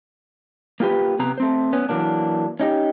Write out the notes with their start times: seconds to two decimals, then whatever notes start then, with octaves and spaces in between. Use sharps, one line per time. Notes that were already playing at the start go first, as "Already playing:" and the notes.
0.80 A#3 F4 G4 B4
1.19 C3 B3 A#5
1.38 A3 C4 C5
1.73 B3 C#4
1.89 E3 F#3 A#3 D4
2.60 C#4 D#4 G4